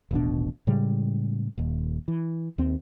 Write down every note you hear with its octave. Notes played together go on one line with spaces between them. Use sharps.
D#1 A1 B2 D4
A2 C#3 G3 G#3
D#1 D#2
E3
D#2 C4